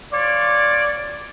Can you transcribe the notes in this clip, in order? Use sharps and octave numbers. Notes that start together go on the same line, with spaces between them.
F4 C#5 D5